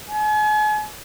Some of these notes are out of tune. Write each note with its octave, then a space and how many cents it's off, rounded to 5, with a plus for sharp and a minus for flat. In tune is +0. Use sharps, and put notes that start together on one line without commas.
G#5 +40